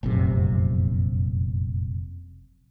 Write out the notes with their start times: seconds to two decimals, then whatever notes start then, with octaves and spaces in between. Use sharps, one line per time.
0.03 F1 A#1 F#2 C3